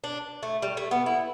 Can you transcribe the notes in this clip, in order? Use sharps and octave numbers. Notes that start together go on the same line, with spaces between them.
D4
A3
G3
A3
B3
E4